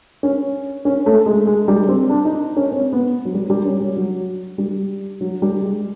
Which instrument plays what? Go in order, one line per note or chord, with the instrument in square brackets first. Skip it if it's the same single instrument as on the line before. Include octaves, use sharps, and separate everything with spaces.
[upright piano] C#4
C#4
A3
G#3
G#3
G3
C4
D4
D#4
C#4
C4
B3
F#3
G3
G3
C#4
G3
F#3
G3
F#3
G3
G#3